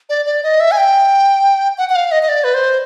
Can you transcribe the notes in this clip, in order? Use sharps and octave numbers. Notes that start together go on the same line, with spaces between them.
D5
D5
D#5
E5
G#5
G5
F#5
F#5
F5
D#5
D#5
D5
B4
C5